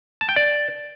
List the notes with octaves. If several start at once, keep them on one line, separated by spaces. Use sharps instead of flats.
A5
G5
D5